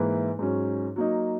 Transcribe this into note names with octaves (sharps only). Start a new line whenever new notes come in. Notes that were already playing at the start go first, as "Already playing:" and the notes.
Already playing: G#2 E3 A#3 E4 B4
G#2 F#3 C#4
F#3 A#3 D#4